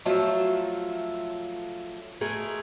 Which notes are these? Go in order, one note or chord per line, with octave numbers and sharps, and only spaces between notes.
F3 F#3 A3 F4 E5
G#3 A3 G#4 A#4